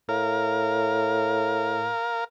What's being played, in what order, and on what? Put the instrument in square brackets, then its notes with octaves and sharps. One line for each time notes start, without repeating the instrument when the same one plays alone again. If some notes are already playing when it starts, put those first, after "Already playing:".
[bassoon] A2 [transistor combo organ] A#4 F5